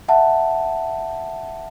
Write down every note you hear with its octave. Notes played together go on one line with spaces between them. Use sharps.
E5 F#5 A5